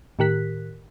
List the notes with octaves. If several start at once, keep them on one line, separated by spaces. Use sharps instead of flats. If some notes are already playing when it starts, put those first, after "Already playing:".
A2 D#3 G4 A#4 F#6 B6